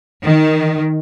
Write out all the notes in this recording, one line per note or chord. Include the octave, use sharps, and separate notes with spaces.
D#3